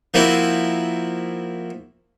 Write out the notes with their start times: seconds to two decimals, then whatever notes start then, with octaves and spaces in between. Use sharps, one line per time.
0.14 F3 A#3 C4 E4 F#4